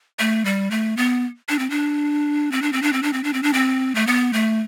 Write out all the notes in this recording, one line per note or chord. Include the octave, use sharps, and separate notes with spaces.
A3
G3
A3
B3
D4
C4
D4
C4
D4
C4
D4
C4
D4
C4
D4
C4
D4
C4
A3
B3
A3